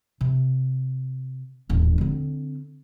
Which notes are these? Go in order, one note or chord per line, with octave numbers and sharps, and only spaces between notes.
C3
D#1 A1
D3 C4